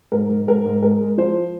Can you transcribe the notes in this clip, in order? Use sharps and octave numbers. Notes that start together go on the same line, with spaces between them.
G#2 A#4
G#2
G#2 A#4
G#2
G#3 A#4
G#3
F3 C5